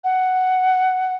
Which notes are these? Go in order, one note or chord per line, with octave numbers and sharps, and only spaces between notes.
F#5